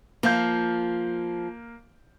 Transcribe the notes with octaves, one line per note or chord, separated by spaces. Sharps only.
F3 A#3 F5 G6